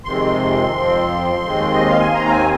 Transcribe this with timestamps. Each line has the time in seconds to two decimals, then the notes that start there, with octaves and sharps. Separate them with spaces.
0.05 F2 C3 D#3 G#3 C4 C6
0.75 F2 F3 C4
1.44 D#2 D#3 G#3 C4
1.73 D#5
1.87 F5
2.00 G#5
2.13 D#2 D#3 C4 A#5
2.25 F5
2.31 G#5